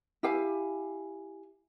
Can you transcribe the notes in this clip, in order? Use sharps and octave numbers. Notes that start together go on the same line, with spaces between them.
E4 G4 F5 G#5